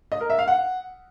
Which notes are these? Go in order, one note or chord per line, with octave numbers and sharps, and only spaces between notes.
D#5
A#4
E5
F5
F#5